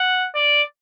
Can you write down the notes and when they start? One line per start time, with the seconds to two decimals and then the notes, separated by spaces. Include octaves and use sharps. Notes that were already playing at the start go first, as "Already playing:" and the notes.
Already playing: F#5
0.35 D5